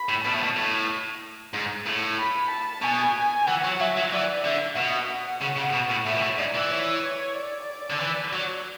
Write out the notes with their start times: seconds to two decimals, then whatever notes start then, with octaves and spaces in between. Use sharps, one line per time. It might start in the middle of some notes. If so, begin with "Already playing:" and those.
Already playing: B5
0.09 A2
0.24 B2 A5
0.34 A2
0.43 B2
0.56 A2
1.54 G#2
1.86 A2
2.18 B5
2.50 A5
2.82 B2 G#5
3.48 E3 F#5
3.64 F#3
3.80 F#3 E5
3.97 F#3
4.12 E3 D5
4.44 D3 E5
4.77 B2 F#5
5.42 C#3
5.57 C#3
5.74 B2
5.90 A2
6.06 A2 E5
6.15 B2
6.22 A2
6.38 G#2 D5
6.55 E3
6.71 C#5
7.35 D5
7.90 D3
8.00 E3
8.33 F#3